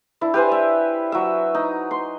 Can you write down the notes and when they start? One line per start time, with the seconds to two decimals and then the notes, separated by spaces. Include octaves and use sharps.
0.21 D4 E4
0.34 G4 B4 C5 G#5
0.52 E5
1.12 F#3 E5
1.55 D#4
1.91 C6